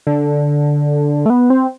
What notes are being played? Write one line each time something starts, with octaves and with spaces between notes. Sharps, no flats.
D3
A3
B3
C4